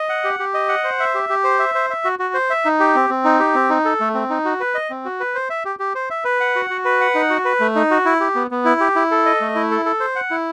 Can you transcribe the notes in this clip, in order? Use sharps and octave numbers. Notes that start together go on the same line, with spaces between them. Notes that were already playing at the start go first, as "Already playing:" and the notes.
Already playing: D#5
F#5
G4
G4
D#5
F#5
C5
E5
G4
G4
C5
E5
C5
E5
F#4
F#4
C5
E5
D#4
G4
C4
C4
D#4
G4
C4
D#4
A4
A3
C4
D#4
F#4
B4
D#5
C4
F#4
B4
C5
E5
G4
G4
C5
E5
B4
F#5
F#4
F#4
B4
F#5
D#4
F#4
B4
A3
D#4
F#4
E4
G4
B3
B3
E4
G4
E4
A4
D#5
A3
E4
A4
A4
C5
F#5
E4